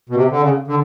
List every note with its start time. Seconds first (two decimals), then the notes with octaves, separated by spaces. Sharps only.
0.10 B2
0.16 C3
0.31 D3
0.42 C#3
0.68 D3